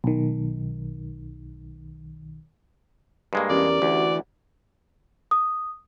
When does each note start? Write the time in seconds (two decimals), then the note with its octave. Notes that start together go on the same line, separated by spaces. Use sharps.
0.04 B1 D#3
3.33 G2 G#3 A#3
3.50 E2 C#4 G4 A#4 D5
3.82 D2 E3 F#4
5.31 D#6